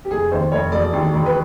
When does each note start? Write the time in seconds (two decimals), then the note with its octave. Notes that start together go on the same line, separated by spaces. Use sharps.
0.05 G4
0.10 F1 G#4
0.31 D#2 C5
0.52 F1 C#5
0.72 E1 D5
0.93 D#2
1.13 E1
1.26 B4